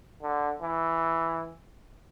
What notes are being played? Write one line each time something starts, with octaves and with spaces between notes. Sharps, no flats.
D3
E3